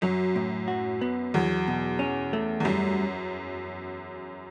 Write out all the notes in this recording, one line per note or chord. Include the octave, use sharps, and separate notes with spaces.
F#2 F#3
A2
F#4
B3
E2 F#3
B2
C#4
A3
E2
F#2 G3